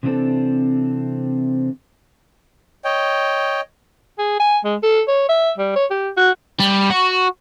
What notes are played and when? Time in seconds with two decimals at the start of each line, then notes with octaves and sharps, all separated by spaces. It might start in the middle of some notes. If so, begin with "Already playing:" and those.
0.03 C3 E3 G#3 C4 D4 A4
2.85 C#5 D#5 G5
4.19 G#4
4.40 G#5
4.64 G#3
4.83 A4
5.08 C#5
5.29 E5
5.58 G3
5.76 C#5
5.91 G4
6.17 F#4
6.60 G3
6.90 F#4